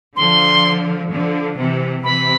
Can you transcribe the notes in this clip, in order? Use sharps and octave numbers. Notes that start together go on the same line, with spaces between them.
D3 F3 C6
D3 F3
C3 E3
C3 E3 B5